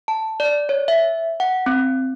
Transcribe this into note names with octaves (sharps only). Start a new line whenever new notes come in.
A5
D5
C#5
E5
F#5
C4